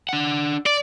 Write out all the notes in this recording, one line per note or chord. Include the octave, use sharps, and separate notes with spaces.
D4 F#5
D5